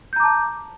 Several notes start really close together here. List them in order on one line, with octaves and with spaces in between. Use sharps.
G6 A#5 D6 A5